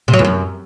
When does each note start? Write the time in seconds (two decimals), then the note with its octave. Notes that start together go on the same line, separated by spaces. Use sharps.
0.08 C3
0.14 F#3
0.19 E2
0.25 F#2